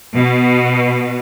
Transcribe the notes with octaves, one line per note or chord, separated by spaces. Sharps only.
B2